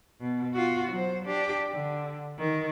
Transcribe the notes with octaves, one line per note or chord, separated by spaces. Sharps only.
B2
F4 F#4
F#3 C5
D4 G4
D3
D#3